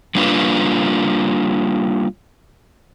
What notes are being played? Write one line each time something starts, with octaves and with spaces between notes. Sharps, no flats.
G3 A#3 D4 F4 B4